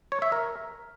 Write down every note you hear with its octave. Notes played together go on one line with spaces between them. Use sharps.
C#5
E5
A#4